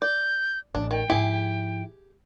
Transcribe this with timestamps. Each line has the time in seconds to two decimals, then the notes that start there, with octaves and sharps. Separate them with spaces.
0.02 D5 G6
0.75 A1 D4
0.91 D#3 G5
1.10 G#2 F3 E4 G4 G#4